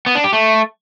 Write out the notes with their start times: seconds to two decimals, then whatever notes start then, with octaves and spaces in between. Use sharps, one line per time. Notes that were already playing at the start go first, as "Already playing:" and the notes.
0.06 B3
0.15 D4
0.24 G4
0.33 A3